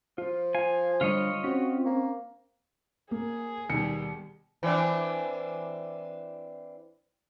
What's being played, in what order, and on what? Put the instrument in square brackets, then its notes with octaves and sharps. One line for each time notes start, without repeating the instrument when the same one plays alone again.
[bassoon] F3 [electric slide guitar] F4
[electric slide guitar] F5 [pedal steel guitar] G#5
[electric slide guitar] D3 G3 [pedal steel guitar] F4 C#5 D#5
[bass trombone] C4 [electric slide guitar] C#4 [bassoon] F#4
[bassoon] A#3
[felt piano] A#3 [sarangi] G#4
[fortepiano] D#2 D#3 [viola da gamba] B2 G3 [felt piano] C#7
[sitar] E3 C4 D4